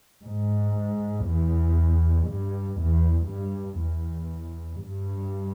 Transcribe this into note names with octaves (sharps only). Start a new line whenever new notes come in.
G#2
E2
G2
E2
G2
E2
G2